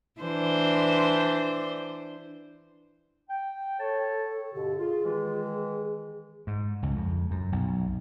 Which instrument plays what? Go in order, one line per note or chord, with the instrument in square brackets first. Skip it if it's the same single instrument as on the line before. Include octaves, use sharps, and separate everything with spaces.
[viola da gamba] E3 D4 C5
[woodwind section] G5
[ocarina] A4 [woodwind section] C#5 A5
[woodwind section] G2 B2 D3 [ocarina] G4
[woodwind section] F4 [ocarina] G#4
[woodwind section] D#3 E3 G#3
[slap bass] G#2
C#2
F2
F#2
B1